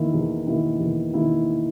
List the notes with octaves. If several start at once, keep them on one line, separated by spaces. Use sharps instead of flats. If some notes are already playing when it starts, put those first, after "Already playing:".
Already playing: E2 D#3 A#3 E4
E2
D#3 A#3 E4
E2
D#3 A#3 E4